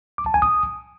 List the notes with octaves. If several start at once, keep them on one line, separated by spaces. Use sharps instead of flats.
D6
A5
G#5
D#6